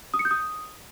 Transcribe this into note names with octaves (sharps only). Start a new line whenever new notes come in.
D#6
C#7
G6
D#6